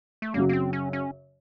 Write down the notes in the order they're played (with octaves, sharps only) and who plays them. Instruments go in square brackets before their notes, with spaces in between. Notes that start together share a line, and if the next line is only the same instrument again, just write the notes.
[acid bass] A3
[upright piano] F#2 C#3 F#3 [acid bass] A#3
[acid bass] A#3
C4
C#4
C#4